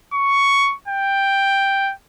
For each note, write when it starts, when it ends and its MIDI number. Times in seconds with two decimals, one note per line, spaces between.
0.14 0.75 85
0.88 1.93 79